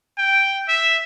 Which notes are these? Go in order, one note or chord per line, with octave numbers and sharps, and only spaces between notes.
G5
E5